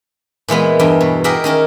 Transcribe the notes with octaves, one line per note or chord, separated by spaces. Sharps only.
A#2 E3 G#3 B3
E2 G2 G5
B2
G4 G#4 A#4 D#5 E5 F#5
D#3 C#4 A#4